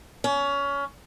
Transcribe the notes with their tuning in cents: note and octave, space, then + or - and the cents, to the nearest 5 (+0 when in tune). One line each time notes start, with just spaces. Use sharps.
C#4 +25